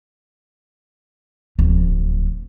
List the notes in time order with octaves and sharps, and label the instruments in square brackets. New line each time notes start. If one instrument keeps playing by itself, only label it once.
[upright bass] D1 F3